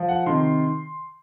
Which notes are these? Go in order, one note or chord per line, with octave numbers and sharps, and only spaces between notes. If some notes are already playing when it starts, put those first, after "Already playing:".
Already playing: F3
F#5
C3 D#3 C6